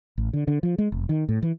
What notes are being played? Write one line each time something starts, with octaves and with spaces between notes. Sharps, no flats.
A1
D3
D3
F3
G#3
F1
D#3
A2
E3